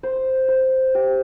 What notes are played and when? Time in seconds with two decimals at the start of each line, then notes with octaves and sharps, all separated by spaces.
0.03 C5
0.48 C5
0.95 G4